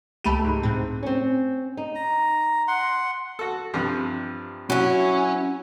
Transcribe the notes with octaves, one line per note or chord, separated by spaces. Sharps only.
C#2 A3 G4 A5 B5 D#7
G#2
A2 C4
C4 C#4
D#4
A#5
F#5 C6
F#4 A4
G2 C3 F3
F#3 C#4 E4